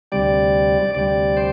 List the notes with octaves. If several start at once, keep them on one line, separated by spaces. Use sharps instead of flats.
D2 C3 G3 D5
D2 C3 G3 D5
C5